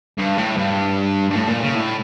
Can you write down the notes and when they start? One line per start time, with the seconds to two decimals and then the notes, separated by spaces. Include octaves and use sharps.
0.18 G2
0.38 A2
0.57 G2
1.30 G2
1.35 A2
1.47 A#2
1.61 C#3
1.75 A2